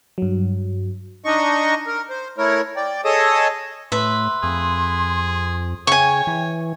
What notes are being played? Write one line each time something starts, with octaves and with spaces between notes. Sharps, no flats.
G2 F#3
D4 D#4 D#5 C#6
A#4
C5
A3 E4 A#4 C#5
D5 G5
G#4 A4 C#5 D#5 A5 D#6
A2 B4 E5 C6
F2 G#4
C#3 C#5 G5 G#5 C#6
E3